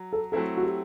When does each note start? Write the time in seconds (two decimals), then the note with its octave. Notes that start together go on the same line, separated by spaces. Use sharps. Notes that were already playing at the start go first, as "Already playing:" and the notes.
Already playing: F#3
0.13 A4
0.32 F#3 A3 C4 E4 A4
0.57 F#4
0.63 G4